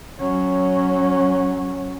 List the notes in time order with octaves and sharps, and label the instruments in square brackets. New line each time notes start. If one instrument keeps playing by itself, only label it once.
[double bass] F#3 C#4